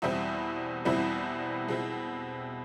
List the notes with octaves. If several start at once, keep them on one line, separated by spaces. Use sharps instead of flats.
E2 B2 G3 C4 E4 E5
E2 B2 G3 C4 E4
B2 G#3 C4 E4